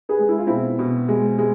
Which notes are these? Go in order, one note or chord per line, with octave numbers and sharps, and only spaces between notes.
G#4 B4
G#3
E4
F4
B2 C4 E4
B2
G#3
G#3